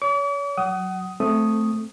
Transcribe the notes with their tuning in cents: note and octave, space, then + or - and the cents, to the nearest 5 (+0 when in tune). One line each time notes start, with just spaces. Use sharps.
C#5 +35 D6 -45
F#3 +0 F#5 +30 D#6 +10
A3 +0 C4 +0 D#6 +0